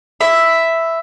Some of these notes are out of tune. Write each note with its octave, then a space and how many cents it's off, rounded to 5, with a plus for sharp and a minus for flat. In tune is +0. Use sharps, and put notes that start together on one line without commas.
E5 +0 B5 +20